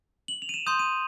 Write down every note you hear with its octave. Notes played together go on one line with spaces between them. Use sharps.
F#7
F7
D#7
E7
C6 D#6 G6 D#7
D#7